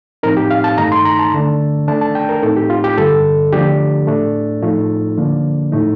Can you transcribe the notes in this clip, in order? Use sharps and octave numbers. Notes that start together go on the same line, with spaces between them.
A2 F3 C4 D#4 A#4
G4
F5
A5
G2 D#3 A3 D#4 A#5
C6
A#5
A5
D3 A3 D4
D#3 A3 D4 A5
A5
G5
A#4
A2 A3 C4 D#4 A4
G4
F4
G4
G2 D3 G3 A4
D3 F3 A3 D4 G4
A2 A3 D4
A2 F3 A3 D#4 F4
D3 F3 A#3 D4
A2 A3 D#4